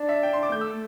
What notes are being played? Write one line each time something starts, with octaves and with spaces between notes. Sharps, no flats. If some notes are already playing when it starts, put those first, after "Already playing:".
Already playing: D4
E5
G5
C6
D6
A3 G6
E6